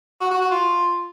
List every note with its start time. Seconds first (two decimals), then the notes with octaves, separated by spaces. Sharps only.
0.21 F#4
0.31 F#4
0.41 F#4
0.51 F4